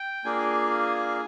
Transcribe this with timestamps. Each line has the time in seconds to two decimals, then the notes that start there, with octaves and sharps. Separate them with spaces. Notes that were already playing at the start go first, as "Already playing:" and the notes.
Already playing: G5
0.24 A#3 D4 F4 G#4 G#5